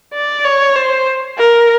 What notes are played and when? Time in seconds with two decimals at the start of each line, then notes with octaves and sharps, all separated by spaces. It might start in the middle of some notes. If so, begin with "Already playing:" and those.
0.14 D5
0.44 C#5
0.75 C5
1.38 A#4